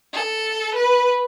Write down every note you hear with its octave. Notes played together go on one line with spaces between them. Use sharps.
A4
B4